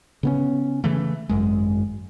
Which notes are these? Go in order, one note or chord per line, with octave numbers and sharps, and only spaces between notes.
C#3 B3 C#4
C#3 E3 A3
G#1 F#2 G#3